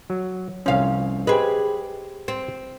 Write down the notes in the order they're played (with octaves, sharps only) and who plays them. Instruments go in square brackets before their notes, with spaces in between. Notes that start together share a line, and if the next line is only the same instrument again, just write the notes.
[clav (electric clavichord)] F#3
[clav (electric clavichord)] C2 C#4 [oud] F3 F5
[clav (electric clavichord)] G4 C5 D#5 [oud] G#4 B4
[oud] C4